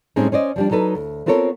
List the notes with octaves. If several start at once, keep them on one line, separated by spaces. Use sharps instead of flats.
A2 G3 G#3 C4 C#4 D#4
C#4 C5 D5 D#5
F3 G3 D4
F#3 D#4 A4 B4
D2
B3 C4 F4 A4 A#4 C#5